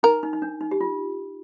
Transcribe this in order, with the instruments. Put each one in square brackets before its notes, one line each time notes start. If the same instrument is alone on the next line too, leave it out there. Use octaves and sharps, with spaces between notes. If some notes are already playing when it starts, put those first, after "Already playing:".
[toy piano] D#4 [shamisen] A#4
[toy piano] D#4
D#4
D4
D#4
G4
F4